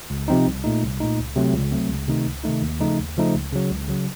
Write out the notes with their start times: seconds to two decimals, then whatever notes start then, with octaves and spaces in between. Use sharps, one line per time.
0.10 C#2
0.28 C3 F3 C4 D#4
0.46 C2
0.64 A#2 A3 D#4
0.83 C2
1.00 A#2 A3 D#4
1.19 C#2
1.36 C3 F#3 A3 C4
1.53 C#2
1.72 C3 F#3 A3 C4
1.90 C#2
2.08 C3 D#3 A3 D#4
2.26 C#2
2.44 C3 D#3 A3 D#4
2.62 D#2
2.80 C#3 F3 A3 D#4
2.99 D#2
3.16 C#3 F3 A3 D#4
3.34 C#2
3.53 C#3 F#3
3.70 C#2
3.88 C#3 F#3